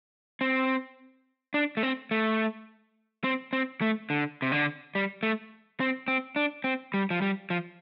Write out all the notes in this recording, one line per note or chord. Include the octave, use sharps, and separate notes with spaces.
C4
D4
A3
C4
A3
C4
C4
A3
D3
C3
D3
G3
A3
C4
C4
D4
C4
G3
F3
G3
F3